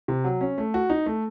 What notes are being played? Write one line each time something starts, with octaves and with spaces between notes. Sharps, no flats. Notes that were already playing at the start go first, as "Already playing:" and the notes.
C3
F#3
C#4
A3
F#4
D#4
A3